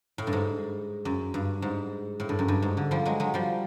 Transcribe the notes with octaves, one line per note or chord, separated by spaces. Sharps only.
A2
G2
G#2
F#2
G2
G#2
A2
G2
F#2
G2
G#2
D3
F3 G3
F#3 G#3
F#3 G#3
F3 G3